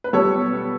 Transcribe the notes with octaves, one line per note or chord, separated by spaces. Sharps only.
B4
G3 A4 C#5
B2
B3